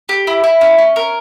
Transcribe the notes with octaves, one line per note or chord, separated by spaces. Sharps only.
G4
E4
E4
C#4
C#4
A#4